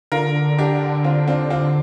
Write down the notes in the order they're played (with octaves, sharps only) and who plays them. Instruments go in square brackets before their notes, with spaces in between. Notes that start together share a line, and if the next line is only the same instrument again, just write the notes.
[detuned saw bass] D3 [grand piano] F4 A#4
[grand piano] D4 G4
C4 F4
C4 F4
C4 F4